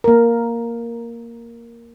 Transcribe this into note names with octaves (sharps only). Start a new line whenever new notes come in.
A#3 A#4